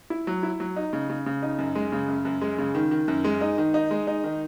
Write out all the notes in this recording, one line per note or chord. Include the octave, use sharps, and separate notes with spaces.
E4
F#3
E4
F#3
D#4
C#3
C#3
C#3
D#4
F#2
G#3
C#3
F#2
F#2
G#3
C#3
D#3
D#3
F#2
G#3
D#4
D#3
D#4
G#3
D#4
D#3